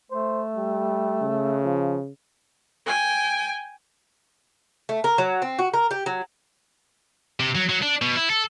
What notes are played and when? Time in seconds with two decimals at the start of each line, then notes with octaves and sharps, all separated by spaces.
0.11 A3 C5
0.57 G3
1.22 C#3
1.64 F3
2.86 G5 G#5
4.89 A3
5.04 A#4
5.18 F#3
5.42 C4
5.59 F#4
5.74 A#4
5.91 G4
6.06 F#3
7.40 C3
7.55 F#3
7.69 F#3
7.82 D4
8.02 B2
8.16 E4
8.30 A4